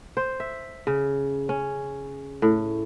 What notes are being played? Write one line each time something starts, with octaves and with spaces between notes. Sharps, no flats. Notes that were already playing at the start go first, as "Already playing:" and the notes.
C5
E5
C#3
C#4
A2